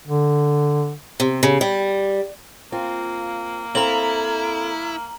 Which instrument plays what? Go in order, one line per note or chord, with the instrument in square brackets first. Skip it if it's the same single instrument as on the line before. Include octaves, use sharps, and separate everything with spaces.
[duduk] D3
[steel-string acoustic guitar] C3
C#3
G3
[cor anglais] A#3 [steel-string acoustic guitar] C4 F4
[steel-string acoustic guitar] C4 A4 F5 [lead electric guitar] E4 [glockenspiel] A#5 F#7